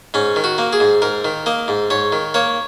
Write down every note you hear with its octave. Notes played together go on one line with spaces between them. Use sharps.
G#2 C#4
D#3
F#4
A#3
G#4
G#2
G#2 A#4
D#3
A#3 D#5
G#2
G#2 C#5
D#3
A#3 C#5